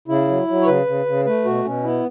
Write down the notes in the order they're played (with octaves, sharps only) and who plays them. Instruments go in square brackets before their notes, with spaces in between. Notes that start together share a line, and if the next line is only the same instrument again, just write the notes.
[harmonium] C#3 E4
F#3
F#3
C#5
C#3 B4
C#3
C#3
A3 B4
B2 F#4
B2 C#4
B3 E4